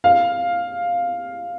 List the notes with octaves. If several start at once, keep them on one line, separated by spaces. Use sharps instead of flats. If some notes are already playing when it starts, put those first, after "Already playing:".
F5